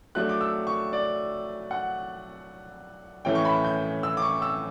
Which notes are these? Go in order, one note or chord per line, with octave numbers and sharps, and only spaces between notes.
F#3 A3 D4 F#6
D6
E6
C#6
D5
F#5
A2 E3 A3 C#4 G5
C#6
B5
G6
E6
D6
C#6
E6